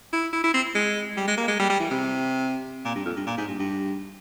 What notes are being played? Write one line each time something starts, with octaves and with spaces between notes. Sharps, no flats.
E4
E4
E4
C4
G#3
G3
G#3
A#3
G#3
G3
G3
E3
C3
A#2
G2
F2
G2
A#2
G#2
G2
G2